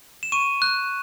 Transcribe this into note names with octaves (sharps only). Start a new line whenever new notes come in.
E7
C#6 D#7
F#6